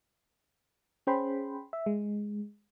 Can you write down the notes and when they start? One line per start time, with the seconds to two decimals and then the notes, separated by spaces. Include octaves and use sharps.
1.07 C#4 G#4 C5 G5 B5 C6
1.73 E5
1.86 G#3